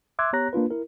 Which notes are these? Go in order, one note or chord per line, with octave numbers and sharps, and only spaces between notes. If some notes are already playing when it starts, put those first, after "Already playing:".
E5 C6 D6 E6 F#6 G#6
B3 G4 C#5 A#5 F#6 A#6
A#3 D4 F4 B4
E4 A#4